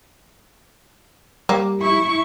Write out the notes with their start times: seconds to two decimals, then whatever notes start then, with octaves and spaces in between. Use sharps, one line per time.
1.49 G3 A#3 G4
1.82 E4 C#6